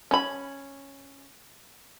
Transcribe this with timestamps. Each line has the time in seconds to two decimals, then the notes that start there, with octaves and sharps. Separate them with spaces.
0.11 C#4 B5